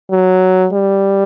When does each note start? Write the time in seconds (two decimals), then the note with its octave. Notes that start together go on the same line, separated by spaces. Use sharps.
0.11 F#3
0.73 G3